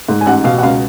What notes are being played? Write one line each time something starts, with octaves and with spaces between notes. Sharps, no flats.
G#2
G#5
A1 F#5
B2 F5
F#5
C#2 F5